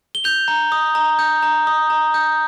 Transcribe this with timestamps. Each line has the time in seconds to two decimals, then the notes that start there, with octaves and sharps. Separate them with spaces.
0.15 G7
0.24 G6 F7
0.48 A#5
0.72 D#6
0.95 A#5
1.19 G6
1.42 A#5
1.67 D#6
1.90 A#5
2.14 G6